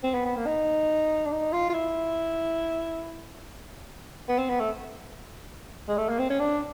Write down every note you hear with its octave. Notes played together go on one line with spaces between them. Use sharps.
C4
B3
B3
A#3
D#4
D4
D#4
F4
F4
E4
B3
C4
B3
A3
G#3
A3
A#3
C4
C#4
D4